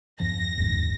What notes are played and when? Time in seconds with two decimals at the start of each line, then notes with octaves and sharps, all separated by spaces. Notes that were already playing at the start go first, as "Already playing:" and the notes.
0.20 E2 G2 F3 A#6
0.58 F#1 D#2 G#2